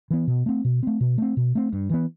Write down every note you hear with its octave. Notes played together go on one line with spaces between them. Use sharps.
E3 B3
B2
A3 C4
B2
A3 C4
B2
A3 C4
B2
A3 C4
G2
E3 B3